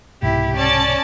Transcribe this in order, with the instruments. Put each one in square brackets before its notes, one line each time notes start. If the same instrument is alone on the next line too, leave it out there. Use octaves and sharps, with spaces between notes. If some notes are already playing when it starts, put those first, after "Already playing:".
[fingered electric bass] C2 G#2 B2 [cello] E4 G4
[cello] C#4 [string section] D5 A5 A6